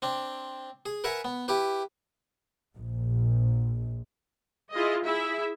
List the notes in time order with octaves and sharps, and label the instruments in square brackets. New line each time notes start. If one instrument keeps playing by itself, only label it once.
[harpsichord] C4 D4
G#4
A#4 B4 E5 F#5 G#5
B3
E4 G4 B4
[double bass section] A#1
[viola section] E4 F4 G#4 D#5
E4 G#4 E5